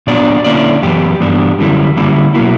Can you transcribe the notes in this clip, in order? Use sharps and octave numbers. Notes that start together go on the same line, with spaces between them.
A#2 F#3 B3 D4 D5
D3 A#3 C#4 E4 D5
F#2 E3 B3 G4
G2 E3 B3 D4
F#2 D3 G3 C#4 E4
D3 G3 A#3 C#4 E4
B2 F#3 A#3 E4 F#4